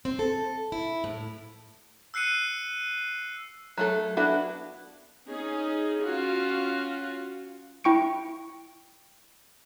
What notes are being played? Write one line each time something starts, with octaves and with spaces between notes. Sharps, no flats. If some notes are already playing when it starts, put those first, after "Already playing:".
C4
A4
E4
A2
E6 F#6 C7 C#7 D#7
F#3 A3 A4
B3 D4 E4 F#4 A4
C#4 D#4 G#4
C#4 F4 F#4
E4 G5 C#6 C#7 D7